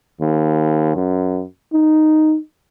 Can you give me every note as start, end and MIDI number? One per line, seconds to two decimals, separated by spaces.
0.21 0.93 39
0.95 1.43 42
1.73 2.37 63